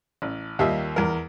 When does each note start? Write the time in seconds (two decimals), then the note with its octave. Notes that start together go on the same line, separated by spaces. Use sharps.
0.22 A1
0.59 D#2 G3 A#3 F4 D#5 E5
0.96 E2 A#4